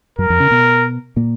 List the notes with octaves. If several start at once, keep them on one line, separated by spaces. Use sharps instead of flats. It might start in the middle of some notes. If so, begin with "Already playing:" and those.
F#2 F#3 A#4
F2 F3
C#3 C#4
B2 B3
A#2 A#3